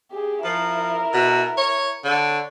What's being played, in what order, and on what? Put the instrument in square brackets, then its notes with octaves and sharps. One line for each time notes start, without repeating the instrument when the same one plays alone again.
[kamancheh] G4 G#4
[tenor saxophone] F3 [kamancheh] E4 A#4
[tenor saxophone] B2
C#5
[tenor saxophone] D3 [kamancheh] C#5